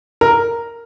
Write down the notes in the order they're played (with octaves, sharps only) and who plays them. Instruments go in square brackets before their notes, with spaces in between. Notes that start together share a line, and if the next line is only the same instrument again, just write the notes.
[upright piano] A#4